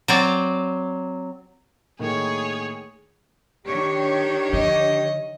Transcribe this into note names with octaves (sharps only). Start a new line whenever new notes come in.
F#3 C4 D5
A2 D#3 A#3 G#4 C#5
D#3 D4 G4 C#5
D3 F3 D#5